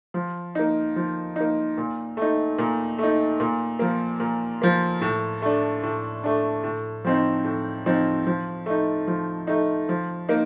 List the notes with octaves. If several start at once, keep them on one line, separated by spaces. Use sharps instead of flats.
F3
A#3 D#4
F3
A#3 D#4
A#2
A3 D#4
A#2
A3 D#4
A#2
F3 A#3
A#2
F3 A#3
A2
A3 D4
A2
A3 D4
A2
F3 C4 D#4
A2
F3 C4 D#4
F3
A3 D#4
F3
A3 D#4
F3
A#3 D#4